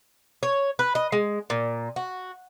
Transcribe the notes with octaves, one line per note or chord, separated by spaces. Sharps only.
C#5
B4
D#5
G#3
A#2
F#4